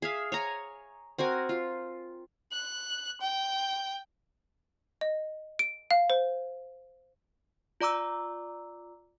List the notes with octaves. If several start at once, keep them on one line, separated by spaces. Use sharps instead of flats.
G#4 E5 F5
C#5 G#5 A#5
C4 F#4 A#4 G#5
F4
F#6
G5
D#5
D7
F5
C5
F4 D5 A#5 D6 E6